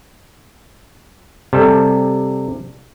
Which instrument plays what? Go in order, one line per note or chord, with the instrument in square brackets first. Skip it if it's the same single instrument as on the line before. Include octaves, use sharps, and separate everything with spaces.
[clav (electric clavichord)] C3 G3 A4